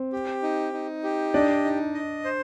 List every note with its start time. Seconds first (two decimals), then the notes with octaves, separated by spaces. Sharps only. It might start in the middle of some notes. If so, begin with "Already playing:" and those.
Already playing: C4
0.12 G4
0.43 D#4
0.73 D#4
1.04 G4
1.34 D4 D5 D#5
1.65 D#4
1.94 D#5
2.24 C5